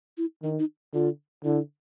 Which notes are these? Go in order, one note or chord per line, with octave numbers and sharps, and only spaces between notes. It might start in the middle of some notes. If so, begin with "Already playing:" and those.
E4
D#3 D#4
D#4
D3 F4
D3 E4